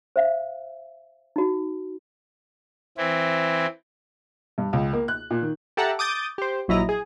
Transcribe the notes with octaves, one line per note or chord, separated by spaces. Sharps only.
C5 E5 F5
D#4 F#4
E3 C4 E4
G2
C#2
A#3
F#6
A#2
D#3
G4 A4 E5 F#5 A5 A#5
D6 D#6 G6 A6
G4 C5
A#1 F#3 E4 D#5 A#5
G#4